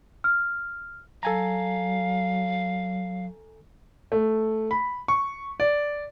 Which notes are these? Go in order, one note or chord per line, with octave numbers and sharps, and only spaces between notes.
F6
F#3 A4 F5 G#5 A#5
A3
B5
C#6
D5